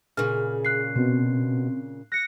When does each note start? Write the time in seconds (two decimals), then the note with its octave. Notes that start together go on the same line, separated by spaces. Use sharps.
0.17 A#2 C#3 G#4 F6
0.65 F#6 C7
0.96 B2 C4
2.12 F#6 A#6 C#7